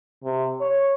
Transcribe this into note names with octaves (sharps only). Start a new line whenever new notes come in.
C3
C#5